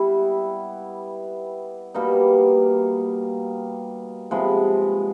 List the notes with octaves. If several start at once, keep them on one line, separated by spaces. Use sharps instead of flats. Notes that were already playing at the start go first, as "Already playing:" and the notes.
Already playing: G3 B3 E4
B2 G3 A#3 D#4
C3 F3 G#3 B3